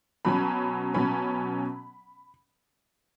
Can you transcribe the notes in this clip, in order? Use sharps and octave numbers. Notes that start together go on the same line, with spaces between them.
B2 F#3 C#4 B5
B2 F#3 C#4 B5